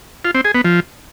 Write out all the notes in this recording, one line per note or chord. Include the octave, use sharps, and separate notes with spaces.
F4
C4
G#4
B3
F3